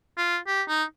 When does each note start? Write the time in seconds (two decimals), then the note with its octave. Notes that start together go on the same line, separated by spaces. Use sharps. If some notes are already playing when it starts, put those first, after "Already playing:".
0.17 F4
0.47 G4
0.68 D#4